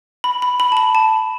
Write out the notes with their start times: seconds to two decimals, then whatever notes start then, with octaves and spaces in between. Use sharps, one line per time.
0.24 B5
0.42 B5
0.60 B5
0.72 A5
0.77 B5
0.95 A5